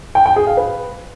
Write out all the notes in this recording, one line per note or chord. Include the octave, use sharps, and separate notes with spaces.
G5
G5
G#4
F5
B4